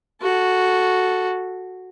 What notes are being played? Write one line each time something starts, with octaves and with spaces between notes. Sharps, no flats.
F#4 A4